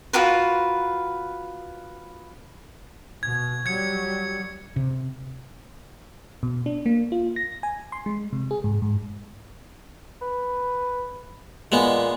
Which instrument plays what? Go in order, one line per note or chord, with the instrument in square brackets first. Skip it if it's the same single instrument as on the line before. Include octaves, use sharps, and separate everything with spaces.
[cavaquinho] F4 F#4 A#4 B4
[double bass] B2 [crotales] G#6
[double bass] F#3 G3 [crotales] G#6 C#7
[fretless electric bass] C3
[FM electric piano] B2
D4
A#3
F4
A#6
G#5
C6
G#3
C3
G#4
G#2
G#2
[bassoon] B4
[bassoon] A#2 [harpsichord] G#3 B3